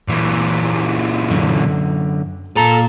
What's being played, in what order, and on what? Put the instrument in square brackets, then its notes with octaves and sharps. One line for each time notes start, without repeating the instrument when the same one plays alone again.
[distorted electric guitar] A#2 E3
[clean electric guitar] F#2 D3
[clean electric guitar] A#2 F4 A#5 [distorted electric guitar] A4